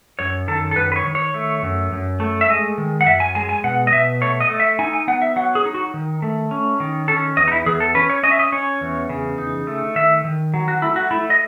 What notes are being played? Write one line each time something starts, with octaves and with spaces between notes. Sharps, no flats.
F#2 C#5
D#3 A4
A4
F#2 B4
B4
C#5
D#3
C#5
A3
F#2
F#2
A3
E5
G#3 D#5
D#3
F#5
F#2 E5
G#5
G#3 G#5
G#5
B2 F#5
D#5
B2 E5
A3 C#5
D#5
A3
E5
D#4 G#5
G#5
B3 F#5
E5
F#3 F#5
G#4
D#4
F#4
D#3
A3
C#4
D#3
C#4 A4
E2 D#5
D#4
E4
E2 G#4
A4
C#4 B4
C#5
C#4 D#5
E5
D#5
C#4 C#5
E2
C#3
D#4
A3
D#3 E5
D#3
F#3
F#4
A3 E4
F#4
A3 E4
D#5